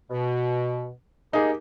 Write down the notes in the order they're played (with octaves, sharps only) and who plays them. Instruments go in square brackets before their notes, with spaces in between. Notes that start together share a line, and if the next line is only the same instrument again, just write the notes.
[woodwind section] B2
[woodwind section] A#3 G4 [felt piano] D#4 G#4